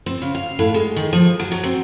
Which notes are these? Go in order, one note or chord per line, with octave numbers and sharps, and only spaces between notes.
C4
C#3
F5
A2
G#3
D#3
F3
F#3
F#3
C4